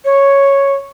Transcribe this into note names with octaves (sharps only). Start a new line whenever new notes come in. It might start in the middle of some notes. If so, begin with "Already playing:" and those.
C#5